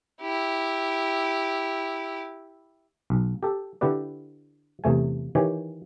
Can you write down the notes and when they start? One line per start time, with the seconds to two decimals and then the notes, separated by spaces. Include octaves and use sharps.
0.21 E4 G4
3.10 B1
3.43 G4 A4
3.81 D3 E4 G4 B4 D5
4.84 E2 C3 A3 G#5
5.35 D#3 E3 G4 C#5 G#5